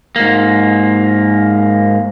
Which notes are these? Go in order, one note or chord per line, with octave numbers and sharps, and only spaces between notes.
G#2 A#3